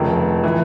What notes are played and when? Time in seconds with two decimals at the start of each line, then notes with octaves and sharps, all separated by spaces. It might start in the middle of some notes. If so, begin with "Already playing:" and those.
Already playing: F1 D#2 C#3 F3
0.44 E3